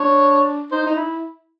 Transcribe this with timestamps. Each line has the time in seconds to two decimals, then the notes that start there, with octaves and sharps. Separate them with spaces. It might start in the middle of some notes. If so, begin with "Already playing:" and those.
Already playing: D4 C#5
0.71 D#4 C5
0.86 D#4
0.96 E4